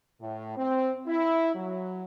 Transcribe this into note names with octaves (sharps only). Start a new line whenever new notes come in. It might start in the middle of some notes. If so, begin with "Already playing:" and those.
A2
C4
E4
F#3